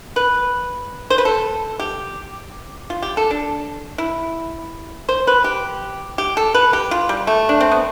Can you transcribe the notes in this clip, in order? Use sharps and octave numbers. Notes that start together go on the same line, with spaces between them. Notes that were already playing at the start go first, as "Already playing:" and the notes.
B4
C5
B4
A4
G4
F4
G4
A4
D4
E4
C5
B4
G4
G4
A4
B4
G4
F4
G3
A3
D4
C4
B3